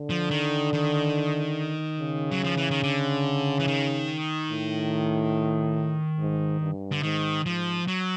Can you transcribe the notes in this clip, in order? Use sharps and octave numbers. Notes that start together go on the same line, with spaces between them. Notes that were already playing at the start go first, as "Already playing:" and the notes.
Already playing: D3
F3
D#3
D#3
C#3
F#3
F3
E3
D#3
D3
E3
D#3
A2
G#2
G2
D3
G#2 D#3
G#2 F3
F#3